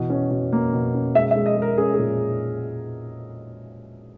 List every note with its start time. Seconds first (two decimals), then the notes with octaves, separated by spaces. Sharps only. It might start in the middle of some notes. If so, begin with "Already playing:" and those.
Already playing: B2 E3
0.10 C#4
0.31 B2
0.53 A#3
0.73 B2
0.94 C#4
1.15 G#3 E5
1.31 E5
1.36 G#3
1.46 D#5
1.56 G#3
1.62 A#4
1.78 C#4 G#4
1.94 G#4
1.99 A#2